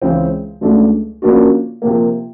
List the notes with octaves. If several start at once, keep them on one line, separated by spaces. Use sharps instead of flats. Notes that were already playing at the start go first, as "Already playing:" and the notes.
C#2 C#3 E3 G#3 C4
C#2 B2 F#3 A3 D4
C#3 F3 A#3 D4 F#4
C3 F3 A#3